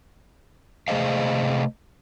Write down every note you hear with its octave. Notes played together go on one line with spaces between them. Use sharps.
C3 A3 G#4 C5 D#5 F5